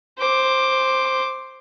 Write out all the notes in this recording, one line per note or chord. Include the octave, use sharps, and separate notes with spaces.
C5 D6